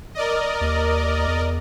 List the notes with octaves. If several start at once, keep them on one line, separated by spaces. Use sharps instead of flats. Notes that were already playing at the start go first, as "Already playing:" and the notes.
A#4 D5 D#5
D#2
E2